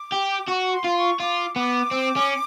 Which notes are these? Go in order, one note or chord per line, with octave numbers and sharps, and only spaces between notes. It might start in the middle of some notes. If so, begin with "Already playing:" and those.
Already playing: D6
G4
F#4 C#6
C6
F4
C#6
F4 D6
B3 D6
C4
C#4